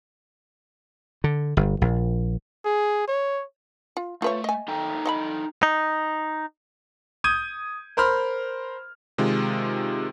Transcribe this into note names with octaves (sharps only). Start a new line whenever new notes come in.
D3
G1
A#1
G#4
C#5
F4
A3 F4 B4 C#5
D#5 G#5
D#4 A4 G5
D#5 F#5 B5
D#4
D#6 G6 G#6 D#7
A#4 C5 B5 C6 F6
C3 D#3 G#3 F4